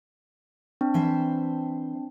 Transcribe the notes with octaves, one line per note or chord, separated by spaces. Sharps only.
C4 D4
E3 C5 E5